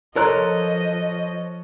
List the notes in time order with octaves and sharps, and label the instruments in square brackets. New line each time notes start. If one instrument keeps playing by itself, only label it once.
[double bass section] F3 [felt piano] A4 C#5 F#6 [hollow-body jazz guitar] A#4 A#5 C6 [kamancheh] D#5